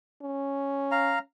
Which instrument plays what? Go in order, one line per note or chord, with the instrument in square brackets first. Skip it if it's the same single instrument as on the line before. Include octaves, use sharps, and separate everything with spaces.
[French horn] C#4
[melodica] F5 A#5